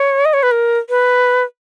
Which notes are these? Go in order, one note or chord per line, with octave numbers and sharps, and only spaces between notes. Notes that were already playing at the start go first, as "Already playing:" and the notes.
Already playing: C#5
D#5
C#5
B4
A#4
B4